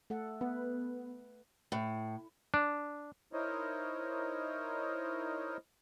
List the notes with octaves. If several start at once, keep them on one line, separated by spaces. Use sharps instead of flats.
A3 A4 F#5
B3 B4
A2
D4
D#4 E4 A#4 C5 C#5 D#5